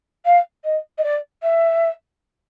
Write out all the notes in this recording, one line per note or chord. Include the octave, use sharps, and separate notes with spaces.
F5
D#5
D#5
D5
E5